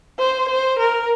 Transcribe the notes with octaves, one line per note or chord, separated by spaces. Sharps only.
C5
C5
A#4